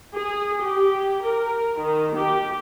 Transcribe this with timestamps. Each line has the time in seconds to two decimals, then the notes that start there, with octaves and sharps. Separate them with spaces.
0.14 G#4
0.61 G4
1.23 A#4
1.77 D#3
2.14 G4